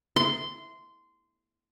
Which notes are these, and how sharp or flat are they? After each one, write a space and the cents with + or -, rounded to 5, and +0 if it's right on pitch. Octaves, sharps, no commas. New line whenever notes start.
C6 -15